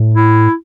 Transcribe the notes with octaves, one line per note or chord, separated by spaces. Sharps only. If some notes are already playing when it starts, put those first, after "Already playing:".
Already playing: A2
E4